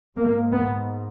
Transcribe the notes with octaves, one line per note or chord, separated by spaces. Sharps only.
G#2 A#3
B3